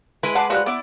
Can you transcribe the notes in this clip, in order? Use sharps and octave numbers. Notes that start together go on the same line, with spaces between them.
G#3 E4 B4
G#4 F#5 A5 D6
F3 G3 F#4 F#6
B3 E4 D5